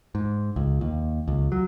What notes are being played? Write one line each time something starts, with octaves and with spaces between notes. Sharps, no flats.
G#2
C#2
D#2
C#2
F#3